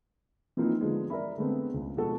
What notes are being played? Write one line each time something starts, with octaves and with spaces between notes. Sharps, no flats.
E3 F3 A#3 C4 D#4 E4
D3 F3 G#3 B3
A#4 D5 E5 B5
D3 G#3 A3 B3 C4
C#2
B2 F3 G#3 F#4 A4